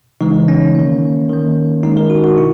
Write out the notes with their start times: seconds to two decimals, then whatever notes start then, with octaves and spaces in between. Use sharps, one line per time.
0.21 C#3 E3 G#3 D#4
0.48 C#4
0.75 D#3 A#3
1.29 D#3 A#3
1.83 D#3 G#3 D#4
1.97 A#4
2.10 F#4
2.24 F#4
2.38 B2 E4